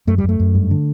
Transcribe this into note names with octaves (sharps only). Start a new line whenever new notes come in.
F#2 A3
G3
F#2 A3
F#2
G2
D3